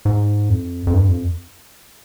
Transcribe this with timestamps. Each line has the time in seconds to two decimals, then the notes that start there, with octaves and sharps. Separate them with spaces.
0.05 G#2
0.50 F2
0.87 F2
0.94 G2
1.08 F2